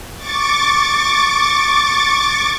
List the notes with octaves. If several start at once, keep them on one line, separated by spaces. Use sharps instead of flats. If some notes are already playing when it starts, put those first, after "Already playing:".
C#6 D6 A6